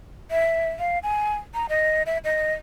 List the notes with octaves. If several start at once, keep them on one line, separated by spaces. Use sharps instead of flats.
E5
F5
G#5
A#5
D#5
E5
D#5